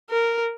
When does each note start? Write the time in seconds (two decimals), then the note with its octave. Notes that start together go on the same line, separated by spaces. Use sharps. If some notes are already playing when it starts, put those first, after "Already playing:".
0.10 A#4